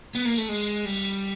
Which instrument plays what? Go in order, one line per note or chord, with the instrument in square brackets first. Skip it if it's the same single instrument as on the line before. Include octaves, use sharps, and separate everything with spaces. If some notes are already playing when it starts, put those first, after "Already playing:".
[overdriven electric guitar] B3
A#3
A3
G#3
G3